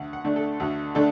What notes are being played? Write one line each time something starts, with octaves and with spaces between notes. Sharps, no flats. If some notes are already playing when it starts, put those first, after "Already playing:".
Already playing: D2 F#5
F#5
D3 A3 D4
A4
D2 F#4
D3 A3 D4 A4